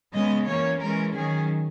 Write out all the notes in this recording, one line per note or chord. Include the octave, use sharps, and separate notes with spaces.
C#3 G#3 B3 D#5
E3 A#3 C#4 C#5
E3 G#3 C#4 A#4
D#3 F#3 C#4 G#4